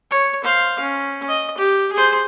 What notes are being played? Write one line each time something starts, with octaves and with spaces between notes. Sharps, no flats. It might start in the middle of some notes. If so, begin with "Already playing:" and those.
C#5
C5 F5
C#4
D#5
G4
G#4 C5